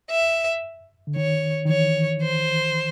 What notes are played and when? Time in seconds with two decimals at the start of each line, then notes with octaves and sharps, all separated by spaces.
0.11 E5
1.07 D3
1.16 D#3 C#5
1.65 D#3
1.69 E3 C#5
2.22 C5